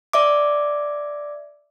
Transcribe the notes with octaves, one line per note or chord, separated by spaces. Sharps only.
D5 E5 D6